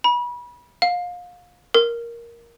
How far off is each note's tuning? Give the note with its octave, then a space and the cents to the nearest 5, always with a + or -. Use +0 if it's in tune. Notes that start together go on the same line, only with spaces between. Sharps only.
B5 -30
F5 +30
A#4 +5